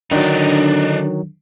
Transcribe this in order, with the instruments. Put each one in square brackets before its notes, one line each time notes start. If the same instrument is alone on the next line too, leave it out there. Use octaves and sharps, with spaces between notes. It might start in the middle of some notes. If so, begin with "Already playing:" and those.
[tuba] D3 [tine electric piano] D#3 F#3 [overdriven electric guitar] D4 D#4